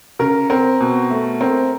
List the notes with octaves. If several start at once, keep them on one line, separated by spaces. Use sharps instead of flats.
C#3 A#4
C4 A#4
B2
A3
C4 A#4